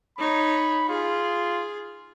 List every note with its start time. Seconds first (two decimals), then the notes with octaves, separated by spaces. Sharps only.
0.18 D#4 C#5 B5
0.89 F4 G#4